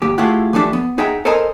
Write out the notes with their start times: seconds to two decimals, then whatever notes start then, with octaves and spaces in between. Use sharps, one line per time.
0.02 D#2 G#2 G4
0.18 A3 E4 F4 G4 G#4 F#5
0.53 E3 F3 A3 D4 G4
0.73 B3
0.98 D#4 G#4 E5 F#5 G5 A#5
1.25 A4 A#4 C5 D#5 G#5 A#5